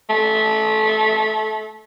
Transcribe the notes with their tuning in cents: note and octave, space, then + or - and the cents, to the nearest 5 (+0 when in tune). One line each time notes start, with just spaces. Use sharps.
A3 -20